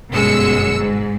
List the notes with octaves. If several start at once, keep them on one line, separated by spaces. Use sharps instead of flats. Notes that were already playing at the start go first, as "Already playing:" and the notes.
G1 F#2 B2 G#3 E6 C#7
G#2